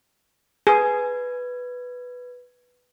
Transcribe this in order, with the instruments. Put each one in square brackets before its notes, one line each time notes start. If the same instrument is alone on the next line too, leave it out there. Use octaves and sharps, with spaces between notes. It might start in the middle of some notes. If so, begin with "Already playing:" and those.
[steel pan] G#4 [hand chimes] B4 G#6